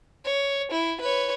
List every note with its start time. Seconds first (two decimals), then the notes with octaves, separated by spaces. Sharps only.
0.25 C#5
0.72 E4
1.01 B4 C#5